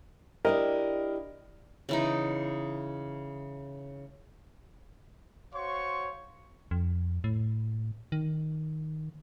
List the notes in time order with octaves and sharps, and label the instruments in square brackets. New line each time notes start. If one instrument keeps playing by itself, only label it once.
[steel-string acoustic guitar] D4 E4 G4 [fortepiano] A#4 D#5
[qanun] C#3 E3 D#4
[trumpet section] F#4 C5 C#5 F5 C6 C#6
[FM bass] F2
A2
D#3